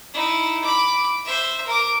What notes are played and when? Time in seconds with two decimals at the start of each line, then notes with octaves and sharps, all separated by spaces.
0.13 D#4 E4
0.64 B5 D6
1.25 C5 E5
1.66 A#4 D6